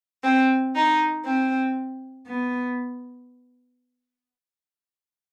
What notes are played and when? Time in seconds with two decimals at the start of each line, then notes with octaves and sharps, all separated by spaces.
0.24 C4
0.75 D#4
1.25 C4
2.27 B3